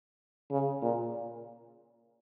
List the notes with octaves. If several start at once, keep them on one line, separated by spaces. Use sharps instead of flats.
C#3
A#2